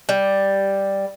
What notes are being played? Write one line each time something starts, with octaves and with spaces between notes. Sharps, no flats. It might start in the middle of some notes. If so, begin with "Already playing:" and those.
G3